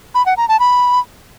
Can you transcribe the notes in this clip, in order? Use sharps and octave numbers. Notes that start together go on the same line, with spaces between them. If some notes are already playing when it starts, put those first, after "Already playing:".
B5
F#5
A#5
A5
B5